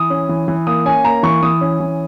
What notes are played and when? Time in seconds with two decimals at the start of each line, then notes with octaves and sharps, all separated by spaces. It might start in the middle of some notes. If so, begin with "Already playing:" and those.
Already playing: E3 D#6
0.10 C#4
0.29 E3
0.48 E3
0.67 A#3 D#6
0.86 C#4 G#5
1.05 A#3 A#5
1.23 E3 C#6
1.42 E3 D#6
1.61 C#4
1.80 E3